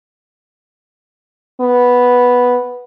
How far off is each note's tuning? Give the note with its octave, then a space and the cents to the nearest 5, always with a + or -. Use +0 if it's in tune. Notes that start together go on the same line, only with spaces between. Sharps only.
B3 -5